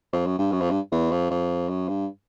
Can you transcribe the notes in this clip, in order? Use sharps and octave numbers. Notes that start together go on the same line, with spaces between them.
F2
F#2
G2
F#2
F2
G2
E2
F2
F2
F#2
G2